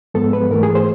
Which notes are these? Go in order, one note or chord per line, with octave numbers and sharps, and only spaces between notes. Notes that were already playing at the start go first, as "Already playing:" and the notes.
G#2 F3 G#3 B3 A4
B4
G#2 E3 A3 A#4
G#4
C5